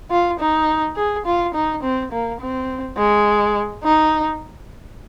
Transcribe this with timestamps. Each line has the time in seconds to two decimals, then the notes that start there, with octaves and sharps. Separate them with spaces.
0.11 F4
0.40 D#4
0.97 G#4
1.26 F4
1.55 D#4
1.83 C4
2.12 A#3
2.41 C4
2.97 G#3
3.84 D#4